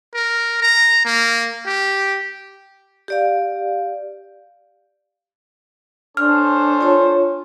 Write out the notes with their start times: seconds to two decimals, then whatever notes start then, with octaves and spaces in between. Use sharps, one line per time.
0.14 A#4
0.62 A#5
1.05 A#3
1.66 G4
3.08 G4 D5 F5
6.17 C#4 D4 A4 C5 F6
6.81 F4 C#5